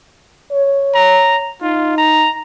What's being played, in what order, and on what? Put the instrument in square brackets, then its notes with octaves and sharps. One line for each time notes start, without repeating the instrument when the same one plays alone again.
[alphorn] C#5
[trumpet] A#5
[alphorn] D#4 [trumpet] F4
[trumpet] A#5